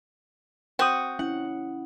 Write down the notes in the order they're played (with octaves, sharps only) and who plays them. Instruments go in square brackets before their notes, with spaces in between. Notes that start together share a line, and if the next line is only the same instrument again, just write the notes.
[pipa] C4 F#4 [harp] D#6 G6 C#7
[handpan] C#4 E4 [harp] F#5